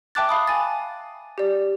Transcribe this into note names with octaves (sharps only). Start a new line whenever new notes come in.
E5 G5 A5 D6 F#6 A6
F5 B5 D#6
G#5 A6
G4 D5